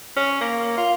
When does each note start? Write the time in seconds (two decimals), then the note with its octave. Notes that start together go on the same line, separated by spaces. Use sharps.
0.16 C#4
0.41 A#3
0.77 F4